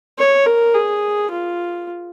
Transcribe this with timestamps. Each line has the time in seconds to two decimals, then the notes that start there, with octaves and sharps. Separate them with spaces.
0.19 C#5
0.47 A#4
0.75 G#4
1.31 F4